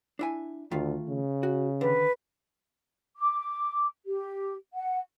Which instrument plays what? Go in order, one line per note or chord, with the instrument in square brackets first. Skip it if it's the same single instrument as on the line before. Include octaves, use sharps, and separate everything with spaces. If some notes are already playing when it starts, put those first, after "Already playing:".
[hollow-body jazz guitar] D4 E4 G#5
[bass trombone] D2 [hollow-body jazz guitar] D#3 A3 F4
[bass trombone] C#3
[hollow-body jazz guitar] F#4
[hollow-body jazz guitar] D3 D#3 [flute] B4
[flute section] D6
G4
F#5